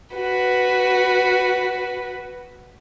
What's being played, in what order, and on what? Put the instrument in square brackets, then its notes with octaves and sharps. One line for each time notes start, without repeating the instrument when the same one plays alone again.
[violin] F#4 B4